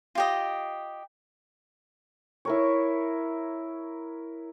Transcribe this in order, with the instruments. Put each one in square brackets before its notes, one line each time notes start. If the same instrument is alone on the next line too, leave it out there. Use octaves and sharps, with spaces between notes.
[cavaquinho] F4 G4 D#5
[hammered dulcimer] E4 A#4 C#5